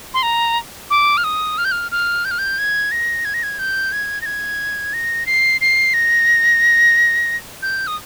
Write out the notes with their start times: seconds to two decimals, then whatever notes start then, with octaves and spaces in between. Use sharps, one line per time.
0.14 C6
0.23 A#5
0.90 D6
1.17 F6
1.24 D#6
1.58 F6
1.65 G6
1.72 F6
1.92 F6
2.25 G6
2.31 F6
2.39 G6
2.58 G#6
2.92 A#6
3.25 G#6
3.34 A#6
3.43 G#6
3.59 G6
3.92 G#6
4.22 A#6
4.26 G#6
4.93 A#6
5.26 C7
5.61 C7
5.94 A#6
7.62 G6
7.87 D#6